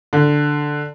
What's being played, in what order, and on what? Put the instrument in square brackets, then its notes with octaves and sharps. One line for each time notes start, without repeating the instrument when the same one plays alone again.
[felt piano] D3